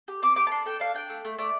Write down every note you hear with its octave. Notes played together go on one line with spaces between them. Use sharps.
G4
C4 D6
G4 D6
A5
D4 C6
A4 G5
D4 F5
D4 G5
A3
A3
A3 D5